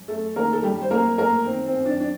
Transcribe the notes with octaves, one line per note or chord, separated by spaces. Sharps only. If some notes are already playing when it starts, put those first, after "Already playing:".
Already playing: F#2
A3 A4
D#3 A#3 A#4
A4
F#2 G3 G4
C5
F#2 A#3 A#4
A3 A#3 A#4
D#3 C4
C4
F#2
D4
D4